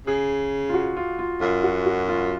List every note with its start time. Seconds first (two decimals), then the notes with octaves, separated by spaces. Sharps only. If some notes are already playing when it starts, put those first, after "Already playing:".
0.07 C#3 G#4
0.69 F4
0.74 F#4
0.97 F4
1.19 F4
1.41 F#2 F4
1.63 F#4
1.86 F#4
2.08 F4